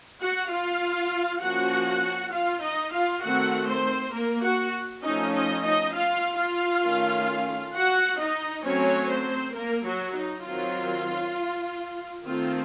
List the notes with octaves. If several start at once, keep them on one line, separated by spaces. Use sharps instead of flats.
F#4 F#5
F4 F5
F3 A#3 C#4 F#4 F#5
F4 F5
D#4 D#5
F4 F5
D#3 A3 C4 F#4 F#5
C4 C5
A#3 A#4
F#4 F#5
F3 A3 C#4 D#4 D#5
D#4 D#5
D#4 D#5
F4 F5
F4 F5
D#3 A3 C#4
F#4 F#5
D#4 D#5
F#3 A3 C4 C#4 C#5
C4 C5
A#3 A#4
F#3 F#4
D#4
D#3 F#3 C4 F4
D#3 A3 C4 F4